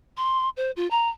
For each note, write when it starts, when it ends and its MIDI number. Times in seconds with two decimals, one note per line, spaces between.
0.17 0.49 84
0.57 0.71 72
0.76 0.89 65
0.91 1.08 82